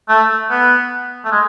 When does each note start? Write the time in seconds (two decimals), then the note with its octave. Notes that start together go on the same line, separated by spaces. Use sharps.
0.09 A3
0.50 B3
1.25 A3
1.31 G#3